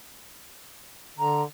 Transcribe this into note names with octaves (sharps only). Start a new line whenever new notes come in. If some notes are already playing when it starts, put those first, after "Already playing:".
D3 A#5